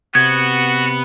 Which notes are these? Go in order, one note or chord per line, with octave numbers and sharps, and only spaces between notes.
C3 B3 F#4 G#6